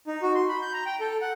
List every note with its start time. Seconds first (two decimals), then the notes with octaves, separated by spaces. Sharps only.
0.08 D#4
0.22 F#4
0.35 C6
0.49 B5
0.62 G6
0.73 A#5
0.86 G5
1.01 A4
1.21 F#5